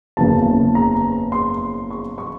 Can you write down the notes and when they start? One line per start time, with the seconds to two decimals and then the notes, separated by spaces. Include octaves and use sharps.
0.17 F#1 E2 C#3 A5
0.75 A#5
1.32 C6
1.90 C#6
2.18 C#6